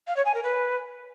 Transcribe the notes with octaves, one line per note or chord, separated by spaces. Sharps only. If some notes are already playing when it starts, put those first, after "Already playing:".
F5
C#5
G#5
A#4
B4